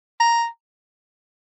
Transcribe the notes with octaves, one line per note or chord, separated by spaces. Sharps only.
A#5